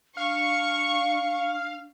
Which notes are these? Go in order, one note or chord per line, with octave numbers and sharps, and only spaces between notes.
D4 F5 C#6